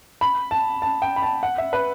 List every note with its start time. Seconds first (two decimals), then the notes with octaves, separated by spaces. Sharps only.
0.21 B5
0.51 A5
0.82 A5
1.02 G5
1.16 B5
1.22 A5
1.43 F#5
1.58 E5
1.73 B4